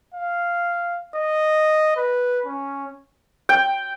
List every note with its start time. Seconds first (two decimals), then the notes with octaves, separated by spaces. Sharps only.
0.14 F5
1.15 D#5
1.97 B4
2.45 C#4
3.49 G5